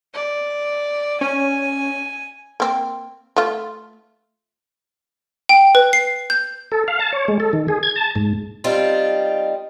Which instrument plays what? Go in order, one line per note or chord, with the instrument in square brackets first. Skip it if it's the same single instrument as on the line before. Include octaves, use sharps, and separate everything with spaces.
[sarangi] D5
[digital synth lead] C#4 [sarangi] G#5
[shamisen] A#3 C4
A3 F4
[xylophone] G5
B4
C7
G6
[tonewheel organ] A4
F5
A5
C#5
G#3
A4
D#3
G#4
G#6
A5
G#2
[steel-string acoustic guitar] G3 C4 D#4 F4